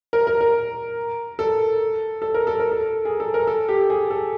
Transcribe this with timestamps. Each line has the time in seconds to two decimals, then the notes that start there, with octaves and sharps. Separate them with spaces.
0.13 A#4
0.27 A#4
0.41 A#4
1.39 A4
2.22 A4
2.34 A#4
2.47 A4
2.59 A#4
2.71 A4
3.05 G#4
3.20 A4
3.34 A#4
3.47 A4
3.69 G4
3.90 G#4
4.10 A4